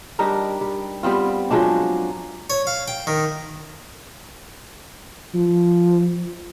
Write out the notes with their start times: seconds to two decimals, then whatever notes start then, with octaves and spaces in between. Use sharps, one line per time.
0.19 G3 D4 D#4 A#4
0.61 G3
1.03 G3 B3 C4 F4
1.51 F3 F#3 G#3 D4
2.50 C#5
2.67 F5
2.88 G5
3.07 D#3
5.34 F3